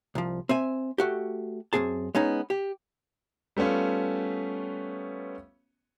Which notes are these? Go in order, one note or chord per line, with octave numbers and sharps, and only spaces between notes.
C2 F3
C4 E5 G#5
A3 F#4 G4
F#2 C3 C4 G#4 A5
G#3 B3 C#4 D#4
G4
G3 A3 B3 C#4 F4